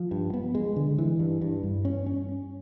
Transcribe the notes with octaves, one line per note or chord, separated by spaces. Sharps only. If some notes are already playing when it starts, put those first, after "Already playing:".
Already playing: F3
G2
B3
G#3
D3
E3
G2
G2
G2
C#4
C#4